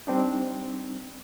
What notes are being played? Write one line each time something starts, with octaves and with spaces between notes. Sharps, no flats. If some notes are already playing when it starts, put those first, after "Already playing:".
G3 C4 D4 D#4